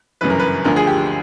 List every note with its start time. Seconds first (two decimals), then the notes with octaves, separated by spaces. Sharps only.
0.21 G1 F#2 C#3 E3 B4
0.30 A#4
0.39 B4
0.64 D2 D3 F3 A#4
0.76 G#4
0.87 G4